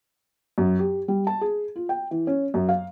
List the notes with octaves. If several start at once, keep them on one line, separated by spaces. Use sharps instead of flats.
F#2
G4
G3
A5
G#4
F4
G5
E3
C#4
F#2
F5